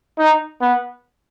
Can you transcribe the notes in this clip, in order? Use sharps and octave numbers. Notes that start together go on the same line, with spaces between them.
D#4
B3